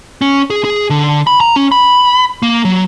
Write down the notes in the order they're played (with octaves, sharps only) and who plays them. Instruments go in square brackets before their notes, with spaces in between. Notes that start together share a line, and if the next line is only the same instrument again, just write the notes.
[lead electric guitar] C#4
G#4
G#4
D3
B5
A#5
C#4
B5
A#3
F#3